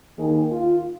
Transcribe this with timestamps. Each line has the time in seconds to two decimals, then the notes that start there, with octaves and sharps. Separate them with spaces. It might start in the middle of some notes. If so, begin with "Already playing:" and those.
0.18 D#2 D#3 G#4
0.51 F4